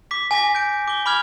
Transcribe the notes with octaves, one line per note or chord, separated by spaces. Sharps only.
D6 B6
G#5 D6 A#6 B6
G6 D7
D6 G7
B5 D6 F6 G#6 F7